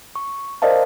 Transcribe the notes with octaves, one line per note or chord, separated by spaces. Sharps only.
C#6
A#4 C5 D5 D#5 F5 A5